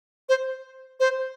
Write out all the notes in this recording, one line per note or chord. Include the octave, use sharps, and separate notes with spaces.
C5
C5